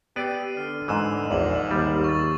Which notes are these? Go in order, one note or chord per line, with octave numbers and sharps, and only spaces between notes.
B3 G4 D5 E6 C7 D#7
D3 F6
G#2 E3 D#6 E6 E7
A#1 E2 G#2 D6 F#7
D#2 G3
C#6 A6